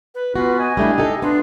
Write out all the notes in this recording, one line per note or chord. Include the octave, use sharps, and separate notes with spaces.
B4
B3 C#4 F4 F#4 B4
D#5 G#5
G3 A3 D4 E4
D#4 G4 A4
B3 D4 F4